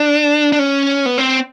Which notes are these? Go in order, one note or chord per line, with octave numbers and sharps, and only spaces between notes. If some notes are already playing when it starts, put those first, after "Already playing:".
Already playing: D4
D4
C#4
B3
C4